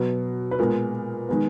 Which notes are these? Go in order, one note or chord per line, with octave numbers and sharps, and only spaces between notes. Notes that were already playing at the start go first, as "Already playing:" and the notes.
Already playing: B2 F#3 B3
B4
A#2 G#3 B3 A#4
D#3 G#3 B3